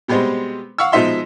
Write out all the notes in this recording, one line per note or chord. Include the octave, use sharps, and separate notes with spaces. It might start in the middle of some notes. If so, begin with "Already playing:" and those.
B2 G3 G#3 B3 C4
F5 F#5 C#6 E6
B2 F3 G#3 D#4 E5 C6